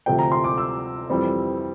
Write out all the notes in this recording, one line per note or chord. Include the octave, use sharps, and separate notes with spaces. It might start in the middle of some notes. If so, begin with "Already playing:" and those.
D2 C3 F3 C4 G5
A#5
C6
D6
E6
F2 E3 G3 C4